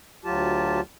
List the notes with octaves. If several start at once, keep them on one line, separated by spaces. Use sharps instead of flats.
D2 F#3 F4 G4 A5